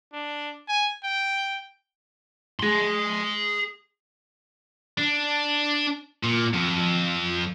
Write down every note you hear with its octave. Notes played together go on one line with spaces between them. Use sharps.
D4
G#5
G5
G#4 C6
D4
A#2
F2